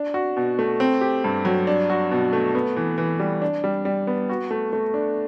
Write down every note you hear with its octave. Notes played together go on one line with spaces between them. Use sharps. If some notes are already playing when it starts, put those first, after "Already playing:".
Already playing: D4
F#4
B2
A3
C4
G4
G2
F#3
D4
F#4
B2
A3
B3
E3
E3
G3
D4
G3
G3
B3
F#4
A3
A3
D4